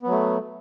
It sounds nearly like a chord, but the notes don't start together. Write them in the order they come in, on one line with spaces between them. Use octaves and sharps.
B3 F#3 A3